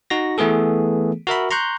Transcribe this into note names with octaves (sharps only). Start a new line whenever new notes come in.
D#4 F#4 A#6
E3 A3 B3 G#4 A4
F#4 A#4 E5 B5
A#5 C6 C#6 F#6 G6